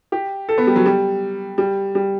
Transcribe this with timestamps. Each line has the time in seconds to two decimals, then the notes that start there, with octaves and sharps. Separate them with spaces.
0.12 G4
0.49 A4
0.58 B3
0.67 G3
0.76 F#3
0.86 G3
1.58 G3
1.95 G3